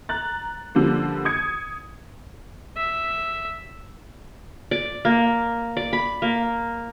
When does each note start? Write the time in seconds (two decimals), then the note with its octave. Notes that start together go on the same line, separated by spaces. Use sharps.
0.09 A#5 F#6 A6
0.75 D3 F3 G3 A#3
1.25 D#6 G#6 C#7
2.77 E5
4.71 D5
5.05 A#3
5.77 D5
5.93 B5
6.22 A#3